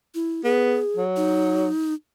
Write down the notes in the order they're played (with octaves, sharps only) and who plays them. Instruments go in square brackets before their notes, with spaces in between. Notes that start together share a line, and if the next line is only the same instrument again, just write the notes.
[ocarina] E4
[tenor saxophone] B3 [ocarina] G#4
[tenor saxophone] F#3
[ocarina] D#4